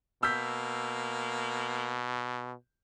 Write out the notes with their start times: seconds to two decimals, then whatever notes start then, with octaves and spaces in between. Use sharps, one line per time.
0.23 B2 A#3 E6 G6 B6